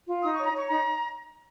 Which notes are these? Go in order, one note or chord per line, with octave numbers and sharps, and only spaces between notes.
F4
D#4 D#6
C#5 C#6
A#5
C#5 C#6
D#4 A#5